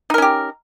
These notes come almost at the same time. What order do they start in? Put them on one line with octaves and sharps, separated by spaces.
D#4 A#4 C#4 G4